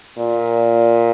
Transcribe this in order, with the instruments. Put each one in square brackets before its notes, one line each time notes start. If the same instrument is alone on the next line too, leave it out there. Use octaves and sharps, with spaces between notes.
[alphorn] A#2